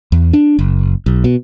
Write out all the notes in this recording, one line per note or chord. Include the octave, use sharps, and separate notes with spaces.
E2
D4
F#1
B1
B2